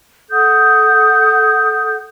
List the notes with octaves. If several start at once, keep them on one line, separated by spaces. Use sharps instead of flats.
A4 F#5 D#6 G6